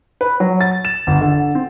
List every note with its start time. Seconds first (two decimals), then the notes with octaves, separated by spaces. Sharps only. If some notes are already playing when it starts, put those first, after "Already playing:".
0.21 B4
0.40 F#3
0.60 A6
0.85 E7
1.07 G1
1.21 D3
1.55 C4